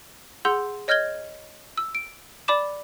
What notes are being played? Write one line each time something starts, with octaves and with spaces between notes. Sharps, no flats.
G#4 F#5 C6 E6 G6
C#5 D#5 F6 G6 G#6 G7
E6
D7
D5 B5 D6 E7